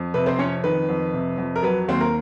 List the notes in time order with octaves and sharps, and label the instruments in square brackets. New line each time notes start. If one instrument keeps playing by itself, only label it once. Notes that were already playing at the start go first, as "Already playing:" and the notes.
Already playing: [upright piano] F2
C3 B4
C4 C5
F2 C#4 C#5
D#3 B4
F2
C3
F2
A#4
F#3 B4
D#2 C4 C5
A#4